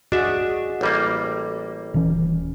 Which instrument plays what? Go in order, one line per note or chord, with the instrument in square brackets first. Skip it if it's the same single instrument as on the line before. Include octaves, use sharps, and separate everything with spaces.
[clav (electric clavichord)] D4 E5 [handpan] F#4 G#4 D#5
[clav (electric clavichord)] A1 G3 A#3
[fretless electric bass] D#1 E3 C#4